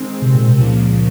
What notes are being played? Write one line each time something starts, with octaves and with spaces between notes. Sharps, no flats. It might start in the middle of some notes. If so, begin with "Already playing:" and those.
Already playing: D#3 G#3 C4
C3
A#2
C3
C#2 A#2 C#3 F3 A#3